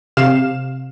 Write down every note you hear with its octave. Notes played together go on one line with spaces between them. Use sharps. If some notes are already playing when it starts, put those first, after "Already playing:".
C3 F5 E7